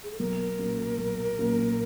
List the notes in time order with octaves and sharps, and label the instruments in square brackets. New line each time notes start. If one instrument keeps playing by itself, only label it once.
[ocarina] G#4
A4
[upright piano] B1 [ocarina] A#4
[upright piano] A#2 F#3 A#3 C#4
B1
A#2 F#3 A#3 C#4